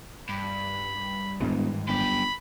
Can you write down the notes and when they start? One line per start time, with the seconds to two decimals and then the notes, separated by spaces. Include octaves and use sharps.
0.29 G2 B5
1.40 E1 G#2 D#3 E3
1.88 G1 F#2 G4 B5